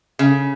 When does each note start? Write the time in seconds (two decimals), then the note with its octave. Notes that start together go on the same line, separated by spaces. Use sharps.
0.19 C#3